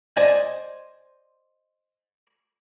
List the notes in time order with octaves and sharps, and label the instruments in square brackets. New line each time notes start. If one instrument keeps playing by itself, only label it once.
[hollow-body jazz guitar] C5 D5 D#5 G#5